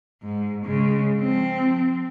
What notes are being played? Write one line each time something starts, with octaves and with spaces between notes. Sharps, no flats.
G#2
C#3 G#3
F3 C4